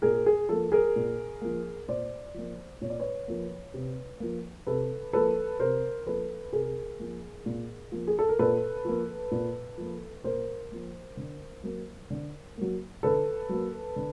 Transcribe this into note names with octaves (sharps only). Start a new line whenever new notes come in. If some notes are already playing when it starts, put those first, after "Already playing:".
A#2 G#4 A#4
G#4
F3 A#3 A4
G#4 A#4
A#2
F3 A#3
A#2 C5 D5
F3 A#3
A#2 C#5
D5
B4 C#5
F3 A#3
C3
F3 A#3
C3 A4 B4
F3 A#3 A4 B4
C3 A#4 C5
F3 A#3 A4 B4
C3 G#4 A#4
F3 A#3
A#2
F3 A#3
G#4
A4
A#4
A#2 A4 B4
F3 A#3
A#2
F3 A#3
A#2 A#4 C5
F3 A#3
D3
F#3 A#3
D3
F#3 A#3
D3 A4 B4
F#3 A#3
D3